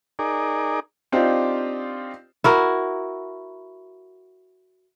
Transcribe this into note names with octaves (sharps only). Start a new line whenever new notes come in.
D#4 G#4 A#4 D5
C4 D4 D#4 F4 G4 C5
E4 F#4 A#4